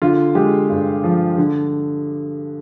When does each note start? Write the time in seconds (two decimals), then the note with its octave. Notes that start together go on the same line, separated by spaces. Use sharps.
0.02 D3 F4
0.35 G#3 G4
0.70 G2
1.04 F3
1.38 D3